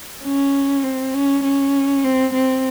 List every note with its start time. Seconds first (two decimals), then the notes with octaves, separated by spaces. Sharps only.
0.24 C#4
0.83 C4
1.14 C#4
1.44 C#4
2.04 C4
2.34 C4